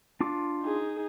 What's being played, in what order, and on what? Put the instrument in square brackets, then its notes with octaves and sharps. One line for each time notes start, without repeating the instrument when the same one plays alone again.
[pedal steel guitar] D4 F4 D6
[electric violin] D#4 G#4